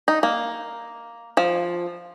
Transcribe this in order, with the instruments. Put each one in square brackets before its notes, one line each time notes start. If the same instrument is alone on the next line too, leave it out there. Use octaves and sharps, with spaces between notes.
[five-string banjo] D#4
A#3
F3